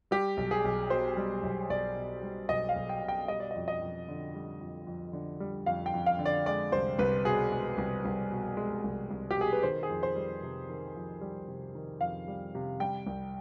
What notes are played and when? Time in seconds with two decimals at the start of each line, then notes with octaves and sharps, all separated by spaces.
0.11 G3 G4
0.37 B1
0.51 G#4
0.65 B1
0.90 B2 C5
1.17 G3
1.43 B1
1.69 B1 D5
1.96 B2
2.23 G3
2.49 B1 D#5
2.69 F5
2.76 B1
2.89 G5
3.02 B2
3.08 G5
3.28 G3 D#5
3.40 D5
3.51 F2 D#5
3.68 D#5
3.81 F2
4.09 D3
4.35 G3
4.61 F2
4.87 F2
5.13 D3
5.40 G3
5.66 F2 F5
5.86 G5
5.94 F2
6.06 F5
6.19 D3
6.26 D5
6.46 G#3 D5
6.72 C2 C5
6.99 C2 B4
7.25 B2 G#4
7.52 G#3
7.78 C2
8.05 C2
8.31 B2
8.57 G#3
8.84 C2
9.11 C2
9.31 G4
9.37 B2 G#4
9.52 B4
9.63 D#3 C5
9.83 G#4
9.89 F2
10.03 C5
10.16 G3
10.43 C3
10.69 D#3
10.96 F2
11.21 G3
11.48 C3
11.75 D#3
12.01 F2 F5
12.28 G3
12.55 C3
12.80 G3 G5
13.07 C2